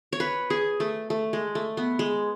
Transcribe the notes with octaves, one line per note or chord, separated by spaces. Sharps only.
C#5
B4
G#4
A3
A3
G#3
A3
B3
G#3